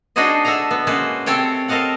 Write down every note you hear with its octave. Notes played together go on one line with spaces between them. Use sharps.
D4 D#4 F#4 G#4 C5 D#5
A4 E5 F#5 G#5 A#5
B3
G#3 A#3 C#4 F#4 B4 C5
C3 C4 A4 C#5 G5
A4 A#4 C5 D#5 F5 F#5